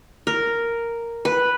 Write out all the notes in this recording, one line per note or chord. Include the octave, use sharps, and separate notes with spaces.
A#4
B4